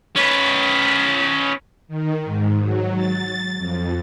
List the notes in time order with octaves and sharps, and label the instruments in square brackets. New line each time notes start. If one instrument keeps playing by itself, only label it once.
[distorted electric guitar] C#4 B4
[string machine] D#3
G#2
F#3
A6
F2